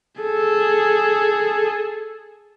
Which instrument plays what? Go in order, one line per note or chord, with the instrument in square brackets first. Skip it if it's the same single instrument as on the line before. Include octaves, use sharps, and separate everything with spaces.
[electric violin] G#4 A4